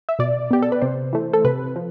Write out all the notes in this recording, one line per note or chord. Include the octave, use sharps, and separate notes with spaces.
E5
B2 D5
B3 G4
A4
B4
C3 C5
E3 A3
A4
C3 B4
F3